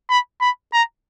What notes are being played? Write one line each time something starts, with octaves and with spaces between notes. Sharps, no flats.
B5
B5
A#5